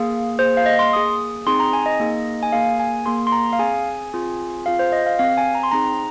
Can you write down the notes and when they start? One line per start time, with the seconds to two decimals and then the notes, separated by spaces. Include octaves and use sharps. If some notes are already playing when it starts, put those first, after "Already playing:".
Already playing: A#3 G#4 F5
0.39 A#3 G#4 C5
0.57 F5
0.66 D#5
0.79 C6
0.92 A#3 G#4 D#6
1.47 C4 D#4 G#4 C6
1.60 A#5
1.73 G#5
1.86 D#5
2.00 A#3 D#4 G#4
2.43 G#5
2.52 A#3 G#4 F5
2.80 G#5
3.06 A#3 G#4 C6
3.27 C6
3.32 A#5
3.53 F5
3.59 C4 G#4 G#5
4.13 C4 F4 G#4
4.66 C4 F4 G#4 F5
4.79 C5
4.92 D#5
5.06 F5
5.19 C4 G#4 F5
5.38 G#5
5.55 A#5
5.63 C6
5.71 C4 D#4 G#4 A#5